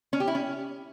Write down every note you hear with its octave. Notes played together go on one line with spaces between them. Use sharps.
C#4
G4
E4
C#4